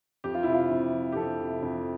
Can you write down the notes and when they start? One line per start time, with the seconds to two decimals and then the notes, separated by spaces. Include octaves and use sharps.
0.24 F2 G4
0.34 F4
0.43 C3 E4
0.53 F4
0.70 F2
0.93 F3
1.12 G4
1.16 F2 A4
1.40 C3
1.62 F2